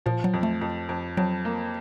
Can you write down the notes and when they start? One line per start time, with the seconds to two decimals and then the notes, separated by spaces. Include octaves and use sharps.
0.06 A#2 F3
0.24 F#3
0.33 F2
0.43 A3
0.61 F2
0.89 F2
1.17 F2 F#3
1.45 A#3